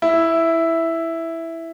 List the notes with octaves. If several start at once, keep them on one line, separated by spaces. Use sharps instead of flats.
E4